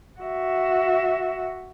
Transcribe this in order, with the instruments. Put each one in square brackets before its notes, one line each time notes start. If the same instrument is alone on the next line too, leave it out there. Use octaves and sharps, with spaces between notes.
[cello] F#4 E5